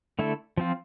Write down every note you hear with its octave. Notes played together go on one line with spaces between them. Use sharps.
D3 A3 E4 A4
F3 C4 F4